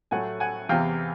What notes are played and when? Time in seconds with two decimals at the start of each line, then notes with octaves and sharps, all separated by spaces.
0.11 A2 F#3 A3 F#5 G#5
0.40 F#5 G#5
0.69 E2 C3 E3 F5 G5